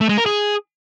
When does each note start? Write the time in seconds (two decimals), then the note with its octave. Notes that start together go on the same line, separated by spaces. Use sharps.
0.01 A3
0.09 G#3
0.18 A#4
0.26 G#4